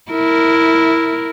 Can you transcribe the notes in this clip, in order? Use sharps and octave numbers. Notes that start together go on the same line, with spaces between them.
E4 A#4